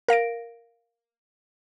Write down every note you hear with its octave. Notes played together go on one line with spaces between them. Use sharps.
A#4 F5 A#6 D7